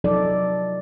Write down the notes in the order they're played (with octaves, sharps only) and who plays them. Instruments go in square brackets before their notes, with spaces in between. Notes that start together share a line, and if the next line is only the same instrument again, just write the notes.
[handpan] C3 F3 F#3 D#4 A4 D5